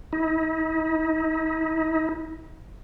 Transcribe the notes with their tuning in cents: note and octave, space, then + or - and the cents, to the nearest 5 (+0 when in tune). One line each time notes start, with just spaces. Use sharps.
D#4 +45